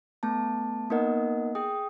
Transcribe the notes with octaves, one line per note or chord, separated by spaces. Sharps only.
A3 B3 A5
A#3 B3 D#4 A#4 D#5 F#5
G#4 G5 D#6